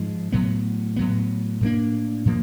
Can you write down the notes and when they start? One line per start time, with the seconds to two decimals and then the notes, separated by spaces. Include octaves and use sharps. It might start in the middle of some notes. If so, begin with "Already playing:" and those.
Already playing: G#2 F3 G#3
0.32 A2 F#3 B3
0.96 A2 F#3 B3
1.61 A2 F3 A#3 D4
2.25 A2 F3 A#3